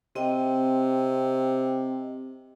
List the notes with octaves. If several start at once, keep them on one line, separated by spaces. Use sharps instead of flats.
C3 C4 D#5 G5